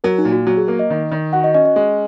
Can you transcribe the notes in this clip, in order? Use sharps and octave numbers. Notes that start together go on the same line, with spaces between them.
F#3 A#4
D#4
A#2
F#4
F#3 F#4
G#4
A#3 A#4
D#5
D#3
D#3
F#4 F#5
D#5
C#4 D#5
D#5
G#3